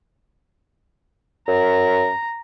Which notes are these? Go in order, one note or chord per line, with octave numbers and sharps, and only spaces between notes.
F#2 A#5